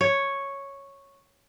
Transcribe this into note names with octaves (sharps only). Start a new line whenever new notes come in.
C#5